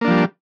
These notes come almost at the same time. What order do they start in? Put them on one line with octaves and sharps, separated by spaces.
A#3 D4 F3 G3